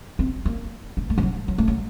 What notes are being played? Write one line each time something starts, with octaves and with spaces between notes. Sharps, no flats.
C4
A#3
A3
A3
F3
F#3
F#3
A3
F#3